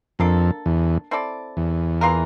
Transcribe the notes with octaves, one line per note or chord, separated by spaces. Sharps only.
F2 A#3 D4 A4
E2
C4 E4 A4 D5
E2
E3 A#3 F4 A#4